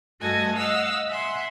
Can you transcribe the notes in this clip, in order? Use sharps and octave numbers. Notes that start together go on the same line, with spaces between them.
G2 A3 F#4 A4 D#5 G#5
D#5 F5 F#5 E6
E5 F#5 G#5 C6